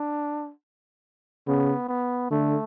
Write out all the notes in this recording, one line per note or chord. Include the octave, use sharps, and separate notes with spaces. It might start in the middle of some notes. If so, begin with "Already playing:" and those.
Already playing: D4
C#3 B3
B3
D3 A3